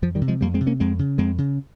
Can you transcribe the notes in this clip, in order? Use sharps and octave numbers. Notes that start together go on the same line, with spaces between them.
F2 F3
D#3 G3
C3
F3 G#3
F2 G3 A#3
G#3 C4
C3
A#3 C#4
F2 G#3 C4
C#3
F2 G#3 C4
C#3